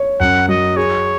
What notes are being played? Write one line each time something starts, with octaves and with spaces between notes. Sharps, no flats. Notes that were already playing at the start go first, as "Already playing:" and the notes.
Already playing: C#5
F#2 F#5
F#3 D#5
G#4 C#5